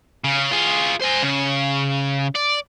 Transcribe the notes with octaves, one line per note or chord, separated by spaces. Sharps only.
C#3
F4 G#4
C5 G#5
C#3
D5